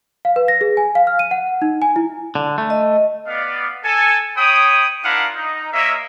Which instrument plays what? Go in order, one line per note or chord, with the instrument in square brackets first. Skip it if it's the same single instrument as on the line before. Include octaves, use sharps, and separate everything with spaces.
[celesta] F5
B4
A#6
G#4
G#5
F5
F6
D#7
F#5
D#4
G#5
E4
[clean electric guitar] D3
A3
[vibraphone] D#5
[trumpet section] B3 D5 F5
A4 G#5
C#5 G5 B5 D#6
D4 E4 F4 A#4 F5 F#5
D#4
A#3 A#4 C#5 D#5 E5